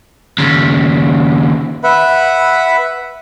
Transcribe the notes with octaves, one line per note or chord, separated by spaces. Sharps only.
D#2 C#3
B4 E5 F#5 B5